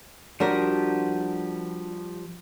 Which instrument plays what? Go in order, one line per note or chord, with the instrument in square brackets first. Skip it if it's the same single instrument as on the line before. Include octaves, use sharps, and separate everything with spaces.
[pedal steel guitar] F3 G3 G4 [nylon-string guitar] D4 F#4 A#4